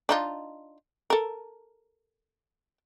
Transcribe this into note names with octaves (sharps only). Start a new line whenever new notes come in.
D4 D#4 F4
A4 A#4